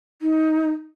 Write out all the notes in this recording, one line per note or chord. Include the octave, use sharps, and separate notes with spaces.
D#4